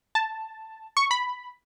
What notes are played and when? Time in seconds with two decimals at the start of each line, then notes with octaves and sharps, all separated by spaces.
0.15 A5
0.97 C#6
1.11 B5